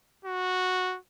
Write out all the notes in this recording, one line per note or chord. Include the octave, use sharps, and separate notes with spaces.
F#4